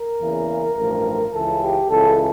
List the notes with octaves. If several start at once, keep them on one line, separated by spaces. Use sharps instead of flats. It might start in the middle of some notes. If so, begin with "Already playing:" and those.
Already playing: A#4
E2 C#3 E3 A#3
A1 G2 F3 A3
C#2 C#3 E3 A4
G4
C#2 C#3 E3 A4